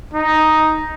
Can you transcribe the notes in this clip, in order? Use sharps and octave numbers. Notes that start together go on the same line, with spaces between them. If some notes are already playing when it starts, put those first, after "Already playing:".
D#4